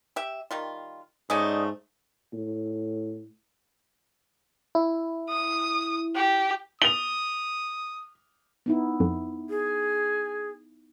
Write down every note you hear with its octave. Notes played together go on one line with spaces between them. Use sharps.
G4 E5
D#3 G3 F4
G#2 A3 C#4 D#4 D5 D#5
A2
E4
D#6
G4
D#6 F7 G7
B3 D#4 E4
F2
G#4